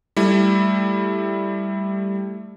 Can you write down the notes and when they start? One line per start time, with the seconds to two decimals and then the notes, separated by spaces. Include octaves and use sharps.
0.17 G3 A3 E4